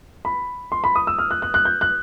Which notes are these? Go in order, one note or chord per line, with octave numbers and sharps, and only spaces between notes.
B5
C6
B5
D#6
E6
F6
F#6
F#6
F#6
G6
F#6